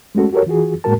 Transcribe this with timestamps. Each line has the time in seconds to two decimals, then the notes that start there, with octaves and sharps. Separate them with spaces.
0.15 G#3 A3 C#4 F#4 A4
0.33 F#4 G4 A4 A#4 C#5
0.46 E3 F4 F#4 G#4
0.84 A2 G#3 A#3 F#4 A#4 A5